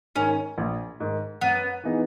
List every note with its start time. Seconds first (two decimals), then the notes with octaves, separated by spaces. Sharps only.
0.15 G#2 D#3 C#4
0.58 A#1
1.00 G#2 D#3
1.41 F#2 B3
1.84 E3 B3 D#4 G#4